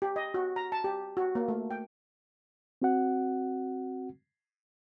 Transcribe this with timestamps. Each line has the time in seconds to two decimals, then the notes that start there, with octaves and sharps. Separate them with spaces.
0.02 G4
0.16 D#5
0.34 F#4
0.56 A#5
0.72 A5
0.84 G4
1.17 F#4
1.35 A#3
1.48 A3
1.71 G5
2.82 C4 F#4 F#5